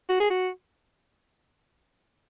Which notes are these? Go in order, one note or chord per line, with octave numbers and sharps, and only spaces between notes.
F#4
G#4
F#4